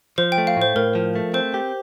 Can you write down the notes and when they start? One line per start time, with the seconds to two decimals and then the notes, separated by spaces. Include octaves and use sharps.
0.18 F3 C5
0.32 G5
0.38 A3
0.47 F5
0.57 A2 C5
0.76 A2 A#4
0.95 F3
1.15 A3
1.34 C4 C5
1.54 G4